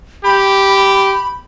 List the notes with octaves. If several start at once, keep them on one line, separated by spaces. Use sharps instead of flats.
G4 B5